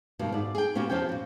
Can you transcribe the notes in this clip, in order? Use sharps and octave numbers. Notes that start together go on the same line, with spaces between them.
G2 B2 D#3
G#2 D5
G#4 G5
A#2 B3 C#4 F#4 G4
E2 G#2 F3 C#4 G5
A#2 F#4